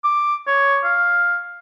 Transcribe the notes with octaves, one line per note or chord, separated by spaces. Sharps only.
D6
C#5
F5